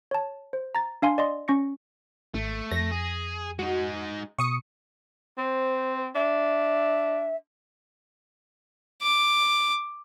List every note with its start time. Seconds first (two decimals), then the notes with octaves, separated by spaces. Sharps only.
0.11 C#5 A5
0.53 C5
0.75 A#5 A6
1.02 D4 F5 G#5 C6
1.18 D5 D#5 C6
1.48 C#4 C#6 A#6 C#7
2.34 G#1 A3
2.71 F2 A#6
2.91 G#4
3.59 G#3 D#4 F#4
4.39 B2 C#6 D#6 C#7
5.38 C4 C5
6.15 D4 E5
9.02 D6